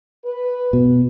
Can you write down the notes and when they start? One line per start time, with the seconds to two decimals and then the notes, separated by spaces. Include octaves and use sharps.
0.24 B4
0.73 B2